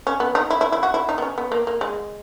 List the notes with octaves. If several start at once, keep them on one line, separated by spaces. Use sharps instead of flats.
C#4
B3
D#4
E4
E4
E4
F#4
E4
D#4
B3
C#4
B3
A#3
A#3
G#3